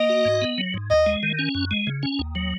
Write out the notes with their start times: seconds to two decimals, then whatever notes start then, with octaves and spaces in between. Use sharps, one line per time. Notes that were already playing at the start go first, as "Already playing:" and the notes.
Already playing: A#3 D#5
0.09 F#4
0.25 G#2
0.42 B3
0.58 F#3
0.74 G#2
0.90 D#2 D#5
1.06 G#3
1.23 D#3
1.39 C#4
1.55 F#2
1.71 G#3
1.87 C#3
2.03 C#4
2.19 D#2
2.35 F#3